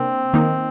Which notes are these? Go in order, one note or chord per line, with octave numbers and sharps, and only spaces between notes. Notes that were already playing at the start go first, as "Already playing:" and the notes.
Already playing: C3 A#3 C4 D4
D#3 A#3 D#4